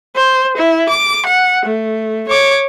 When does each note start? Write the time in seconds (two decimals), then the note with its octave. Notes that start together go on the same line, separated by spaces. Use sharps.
0.16 C5
0.57 E4
0.89 D6
1.26 F#5
1.66 A3
2.28 C#5 D6